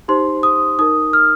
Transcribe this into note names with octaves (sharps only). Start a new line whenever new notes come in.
D#4 G4 C5 C6
D#6
D#4 A#4 D#6
F6